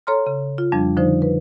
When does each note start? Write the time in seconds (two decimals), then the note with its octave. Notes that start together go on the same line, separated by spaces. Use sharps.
0.07 A4 C#5 A#5 C6 F6
0.27 C#3
0.58 F4
0.72 F2 F3 G3 D4
0.97 D3 F3 D#4 C5
1.22 B4